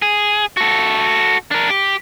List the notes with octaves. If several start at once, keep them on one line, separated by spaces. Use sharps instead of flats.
G#4
F#4 A4
D4 A#4
G4